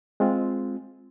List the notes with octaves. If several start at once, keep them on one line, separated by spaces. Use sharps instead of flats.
G#3 C4 F4